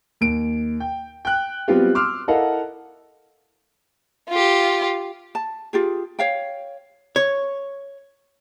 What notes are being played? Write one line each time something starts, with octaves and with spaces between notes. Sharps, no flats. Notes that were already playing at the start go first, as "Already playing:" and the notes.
D#2 D7
G5
G5 F#6
F#3 G3 B3 C4 F4 G4
C6 D6 E6 F6
E4 A4 A#4 D#5 F5 F#5
F4 G4
A5
F4 G4 G#4
C#5 F5 G5
C#5